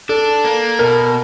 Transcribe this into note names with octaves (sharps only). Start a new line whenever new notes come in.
D4 A4
A#3
B2 A#4